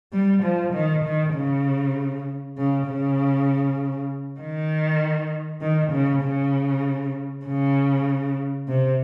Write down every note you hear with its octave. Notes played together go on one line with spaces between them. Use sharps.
G3
F3
D#3
D#3
C#3
C#3
C#3
D#3
D#3
C#3
C#3
C#3
C3